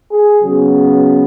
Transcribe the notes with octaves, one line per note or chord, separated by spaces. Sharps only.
G#4
C#3 F#3 B3